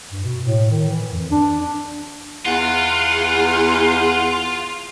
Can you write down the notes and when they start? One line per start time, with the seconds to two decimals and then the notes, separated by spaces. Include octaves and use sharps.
0.12 G2
0.23 B2
0.43 A2
0.71 D#3
0.88 E3
1.10 F2
1.31 D4
2.46 E2 F4 F#5